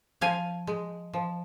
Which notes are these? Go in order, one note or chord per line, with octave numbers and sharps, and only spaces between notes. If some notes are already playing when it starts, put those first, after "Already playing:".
F3 F5 G#5
G#3
F3